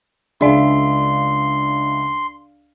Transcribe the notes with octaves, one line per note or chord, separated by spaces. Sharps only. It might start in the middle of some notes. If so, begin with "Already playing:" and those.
C#2 D4 D5 E5 F5 C6